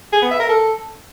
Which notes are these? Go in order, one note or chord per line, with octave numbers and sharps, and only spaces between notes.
G#4
B3
E5
A#4
A4